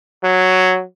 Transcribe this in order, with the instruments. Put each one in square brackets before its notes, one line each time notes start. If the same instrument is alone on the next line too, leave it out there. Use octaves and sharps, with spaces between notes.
[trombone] F#3